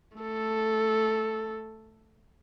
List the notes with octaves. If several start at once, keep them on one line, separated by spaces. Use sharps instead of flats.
A3 A4